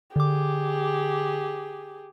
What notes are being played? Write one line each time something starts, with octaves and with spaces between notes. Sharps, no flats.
D3 G4 G#4 D6